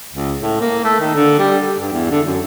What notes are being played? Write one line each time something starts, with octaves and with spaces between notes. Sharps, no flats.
C#2
A2
A#3
A3
D#3
D3
G3
G4
G2
E2
D3
F#2